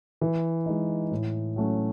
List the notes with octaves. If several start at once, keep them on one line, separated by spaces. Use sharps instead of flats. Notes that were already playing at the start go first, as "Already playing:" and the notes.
E3
G#3 D#4
A2
F#3 A3 C#4 F#4